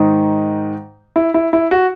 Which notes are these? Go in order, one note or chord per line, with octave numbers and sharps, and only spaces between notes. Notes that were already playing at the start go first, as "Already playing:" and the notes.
Already playing: G#2 D#3 D#4
E4
E4
E4
F#4